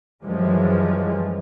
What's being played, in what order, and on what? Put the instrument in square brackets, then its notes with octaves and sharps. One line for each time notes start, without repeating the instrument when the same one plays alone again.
[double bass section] F#2 E3 F3 G3 G#3